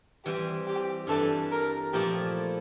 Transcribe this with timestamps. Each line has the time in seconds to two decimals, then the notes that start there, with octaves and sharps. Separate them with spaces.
0.25 E3 G3 C4 G4
0.67 G4
1.07 G2 E3 G3 A4
1.51 A#4
1.93 A#2 F3 A3 E4 G4